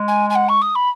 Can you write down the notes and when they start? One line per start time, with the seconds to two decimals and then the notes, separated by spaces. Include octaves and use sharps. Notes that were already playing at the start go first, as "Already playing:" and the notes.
Already playing: G#3
0.08 G#5
0.30 G#5
0.35 F#5
0.49 C#6
0.62 D#6
0.75 B5